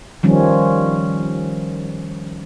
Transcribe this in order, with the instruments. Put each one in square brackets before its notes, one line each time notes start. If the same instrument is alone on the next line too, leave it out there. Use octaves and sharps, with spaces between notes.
[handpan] D#3 F3 G3 C#4